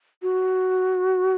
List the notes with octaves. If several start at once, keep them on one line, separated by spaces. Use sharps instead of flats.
F#4